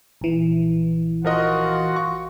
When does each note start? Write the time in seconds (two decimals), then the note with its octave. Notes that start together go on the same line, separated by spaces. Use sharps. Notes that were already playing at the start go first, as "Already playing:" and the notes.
0.21 A#1 E3
1.25 F3 F4 F#4 A#4 D#5 F#5
1.96 C#6